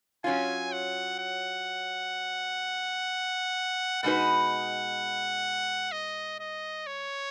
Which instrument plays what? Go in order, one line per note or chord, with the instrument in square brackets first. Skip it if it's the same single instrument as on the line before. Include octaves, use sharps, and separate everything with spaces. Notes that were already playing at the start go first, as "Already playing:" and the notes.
[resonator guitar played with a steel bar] F#3 C#4 F4 [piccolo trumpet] G#5
[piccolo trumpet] F#5
F#5
[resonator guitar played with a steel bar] B2 G#3 D#4 F#4 B4 [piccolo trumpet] F#5
[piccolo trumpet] D#5
D#5
C#5